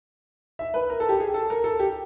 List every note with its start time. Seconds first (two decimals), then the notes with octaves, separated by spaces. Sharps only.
0.59 E5
0.74 B4
0.90 A#4
1.00 A4
1.09 G4
1.20 G#4
1.34 A4
1.50 A#4
1.64 A4
1.79 G4